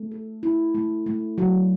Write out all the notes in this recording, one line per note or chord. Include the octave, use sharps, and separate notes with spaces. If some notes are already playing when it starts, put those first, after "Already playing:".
Already playing: A3
A4
E4
A3
A3
F#3